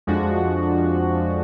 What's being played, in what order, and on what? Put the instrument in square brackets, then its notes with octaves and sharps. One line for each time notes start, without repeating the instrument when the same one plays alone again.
[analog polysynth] F2 F3 G#3 D4 F#4